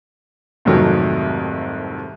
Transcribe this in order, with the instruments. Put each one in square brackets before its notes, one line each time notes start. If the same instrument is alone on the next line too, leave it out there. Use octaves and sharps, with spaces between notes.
[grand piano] C2 F2 G#2 D#3 F#3 A3